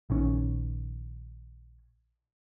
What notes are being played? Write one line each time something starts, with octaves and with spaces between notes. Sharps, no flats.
A#1 D#3 C#4